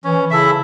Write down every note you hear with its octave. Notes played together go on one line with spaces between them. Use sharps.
E3 C#4
C#3 E4 A4 E5